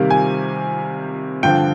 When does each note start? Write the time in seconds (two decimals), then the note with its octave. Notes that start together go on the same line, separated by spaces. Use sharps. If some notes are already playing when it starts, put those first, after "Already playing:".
Already playing: C3 D#3 G3 A#3
0.10 G#5
1.43 G2 D3 F3 G5